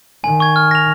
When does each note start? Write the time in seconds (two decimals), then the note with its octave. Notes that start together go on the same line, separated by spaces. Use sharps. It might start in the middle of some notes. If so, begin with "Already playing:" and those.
0.24 D#3 G#5
0.40 C#6 G#6
0.56 F6
0.71 A#6 F7